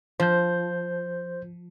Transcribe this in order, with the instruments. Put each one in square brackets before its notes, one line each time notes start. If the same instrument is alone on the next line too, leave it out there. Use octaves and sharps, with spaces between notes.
[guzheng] F3 [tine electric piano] C5 G6